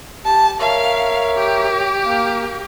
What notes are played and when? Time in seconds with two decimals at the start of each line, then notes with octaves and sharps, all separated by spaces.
0.25 G4 A5
0.60 A#4 C#5 E5 F5
1.37 G4
2.05 A#3 F5